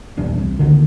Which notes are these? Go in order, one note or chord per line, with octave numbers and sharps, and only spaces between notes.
D#1 B1 E2 D4
C2 F2
C#2 D3 D#3